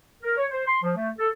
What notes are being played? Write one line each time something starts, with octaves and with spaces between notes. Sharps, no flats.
A#4
C#5
C5
C6
F3
A3
A4